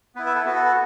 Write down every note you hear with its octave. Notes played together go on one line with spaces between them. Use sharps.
B3 E4 B4
B4 E5
A4
B3 F#4 B4
A4
A4